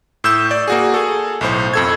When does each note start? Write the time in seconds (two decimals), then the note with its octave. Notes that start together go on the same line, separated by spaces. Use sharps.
0.24 A2 E6 G6 E7
0.51 D5
0.68 A#3 F#4 G#4
0.94 G#4 A4
1.41 B1 A2 C5
1.74 F2 A4 G#6